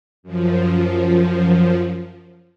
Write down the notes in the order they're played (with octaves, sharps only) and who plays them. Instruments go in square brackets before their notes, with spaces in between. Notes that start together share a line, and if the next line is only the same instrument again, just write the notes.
[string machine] F#2 F3